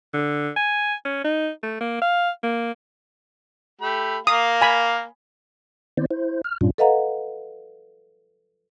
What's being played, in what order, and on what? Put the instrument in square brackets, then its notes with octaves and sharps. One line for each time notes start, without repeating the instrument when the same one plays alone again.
[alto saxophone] D3
G#5
C#4
D#4
A3
A#3
F5
A#3
[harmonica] A3 G4 B5
[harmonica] A#3 F5 [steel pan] D#6
[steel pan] G#5 B5
[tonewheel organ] D#3 B3 C4 E4 C5 D5
E4 C5
F6
G2 A#2 G3 C#4 D4 F4
[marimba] A4 B4 D#5 F5 F#5 A#5